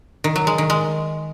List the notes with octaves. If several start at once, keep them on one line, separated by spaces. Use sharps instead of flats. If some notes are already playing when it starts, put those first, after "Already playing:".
D#3
F#3
G#3
D#3
G#3